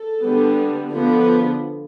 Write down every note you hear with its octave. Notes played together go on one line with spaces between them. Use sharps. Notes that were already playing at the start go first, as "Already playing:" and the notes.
Already playing: A4
D3 G3 B3
D3 F3 B3